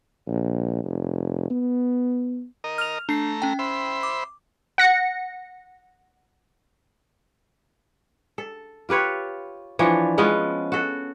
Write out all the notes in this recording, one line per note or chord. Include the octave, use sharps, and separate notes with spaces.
A#1
F1
B3
A#4 D#5
F6 F7
A3 D4 A#5 C7
C#4 G5
C5 E5 B5
D6
F#5 A#6 C#7
A4
F4 G4 B4 C#5
E3 F3 D4 C#5
F3 G#3 B3 C#4
F#4 A4